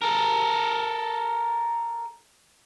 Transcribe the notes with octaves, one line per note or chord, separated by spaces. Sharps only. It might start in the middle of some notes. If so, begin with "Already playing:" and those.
A4 A#4